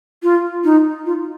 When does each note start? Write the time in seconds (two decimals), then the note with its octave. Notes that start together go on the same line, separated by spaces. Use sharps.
0.23 F4
0.64 D#4
1.06 F4